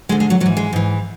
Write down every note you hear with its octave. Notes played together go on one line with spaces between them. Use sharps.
D2 D3 G#3
G#3
F#3
G#2 F#3
E3
G#3
G#2 E3